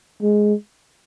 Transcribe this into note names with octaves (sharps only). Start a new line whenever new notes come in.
G#3